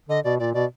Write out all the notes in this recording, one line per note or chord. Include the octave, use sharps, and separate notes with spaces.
D3 D#5
B2 D5
A#2 D5
B2 D5